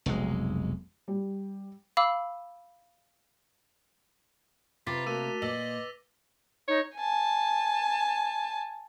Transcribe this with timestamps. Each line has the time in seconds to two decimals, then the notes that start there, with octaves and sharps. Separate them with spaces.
0.06 F1 B1 G#3
1.08 G3
1.97 F5 B5 D6 E6
4.87 C3 F4 B4 A#5 B5 D6 A6 B6
5.06 A3 A#3 F#4 A#4 D6 E6 D#7
5.42 A#2 B4 D#5 D6 E6 A#6 F#7
6.68 D#4 C#5
6.96 G#5 A5